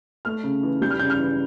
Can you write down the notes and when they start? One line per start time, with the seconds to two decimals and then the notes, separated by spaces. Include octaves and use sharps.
0.25 A3 F6
0.44 C#3
0.63 E3
0.81 G3 G6
0.90 F6
0.99 C#3 G6
1.10 F6
1.19 E3